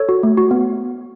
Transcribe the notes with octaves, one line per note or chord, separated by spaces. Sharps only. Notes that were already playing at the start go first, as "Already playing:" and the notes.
Already playing: A4 C#5
F#4
A3
F#4
B3